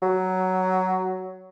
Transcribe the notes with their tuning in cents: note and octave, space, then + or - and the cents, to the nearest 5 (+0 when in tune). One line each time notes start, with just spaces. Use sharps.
F#3 +10